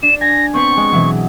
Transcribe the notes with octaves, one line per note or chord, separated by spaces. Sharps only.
D4 E7
G#5 A#6
B3 C4 B4 C#6
G#3
B2 E3 F#3